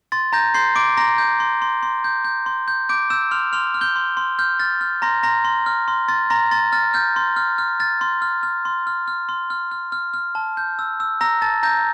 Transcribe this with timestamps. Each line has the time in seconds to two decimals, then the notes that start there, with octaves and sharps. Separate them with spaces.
0.12 C6 A6
0.33 A#5 G6 A#6
0.54 C6 G6 C7
0.75 C6 D6 D7
0.97 A#5 C6 A#6
1.18 G6
1.40 C6
1.62 C6
1.83 C6
2.04 G6
2.25 G6
2.46 C6
2.68 G6
2.89 D6 G6 D7
3.10 E6 G6 E7
3.31 C6 F6 F7
3.53 C6 F6 F7
3.74 F6
3.81 G6 G7
3.96 C6
4.17 C6
4.39 F6 G6
4.60 F6 A6
4.81 F6
5.02 A#5 C6 A#6
5.23 A#5 C6 A#6
5.45 C6
5.66 F6
5.88 C6
6.08 C6 A6
6.30 A#5 C6 A#6
6.51 C6 A6
6.72 F6 A6
6.94 F6 G6
7.16 C6
7.36 F6
7.58 F6
7.80 F6 A6
8.01 C6
8.22 F6
8.43 F6
8.65 C6
8.87 F6
9.08 F6
9.29 C6
9.50 F6
9.71 F6
9.92 F6
10.14 F6
10.35 A5
10.57 G6
10.79 E6
11.00 E6
11.21 A#5 E6 A#6
11.42 A5 A6
11.63 A#5 G6 A#6